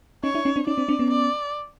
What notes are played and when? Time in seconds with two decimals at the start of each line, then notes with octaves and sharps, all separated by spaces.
0.23 C#4 D#4 C#5
0.34 D4 E4
0.45 C#4 D#4
0.56 C4 D4
0.67 C#4 D#4 D5
0.78 C4 D4
0.89 C4 D4
0.99 B3 C#4
1.11 D5